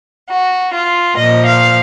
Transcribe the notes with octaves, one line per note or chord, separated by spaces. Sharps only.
F#4
F4
A#2 F3 D#5
F5